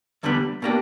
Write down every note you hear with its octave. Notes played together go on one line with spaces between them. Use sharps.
E2 D3 G3 B3
B2 A#3 D4 G4